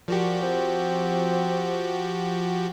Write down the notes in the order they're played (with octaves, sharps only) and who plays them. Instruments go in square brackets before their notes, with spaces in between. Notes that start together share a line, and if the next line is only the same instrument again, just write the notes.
[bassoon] A#2 [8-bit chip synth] F3 F#4 G4
[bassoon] C4